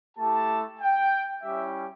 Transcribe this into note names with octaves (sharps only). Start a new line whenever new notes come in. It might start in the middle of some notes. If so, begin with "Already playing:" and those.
A3 E4 G4 A5
G5
G3 C#4 E4 G4 E5